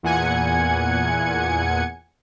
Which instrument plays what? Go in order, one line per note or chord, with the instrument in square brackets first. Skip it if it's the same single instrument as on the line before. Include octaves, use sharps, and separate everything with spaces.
[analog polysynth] E2 A#2 F#5 G#5 G#6 C#7